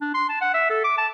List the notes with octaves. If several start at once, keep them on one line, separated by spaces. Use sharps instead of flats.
D4
C6
A5
F#5
E5
A4
D6
A5